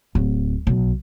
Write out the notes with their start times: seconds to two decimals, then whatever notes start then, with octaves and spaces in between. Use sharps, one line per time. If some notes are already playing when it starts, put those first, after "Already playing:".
0.15 D1
0.67 B1